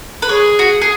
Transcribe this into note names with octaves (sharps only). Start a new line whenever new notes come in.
B4
G#4 C#5
F#4
G#4